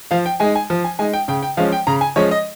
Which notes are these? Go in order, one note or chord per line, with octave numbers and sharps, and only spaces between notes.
F3 F5
G5
G#3 D#4 G#5
G#5
F3
G#5
G#3 D#4 G#5
G5
C#3 G5
G5
F3 G#3 C#4 F5
G5
C#3 A#5
G#5
F3 G#3 C#4 C#5
D#5